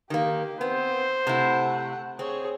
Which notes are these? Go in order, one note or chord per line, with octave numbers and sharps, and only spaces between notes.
D#3 A#3 G4
B3 C4 C5
C3 A3 E4 F#5
C4 G#4 C#5